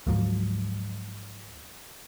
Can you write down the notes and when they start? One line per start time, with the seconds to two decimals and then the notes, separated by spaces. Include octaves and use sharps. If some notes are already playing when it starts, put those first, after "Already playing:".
0.07 D2 G#2 F3 F#3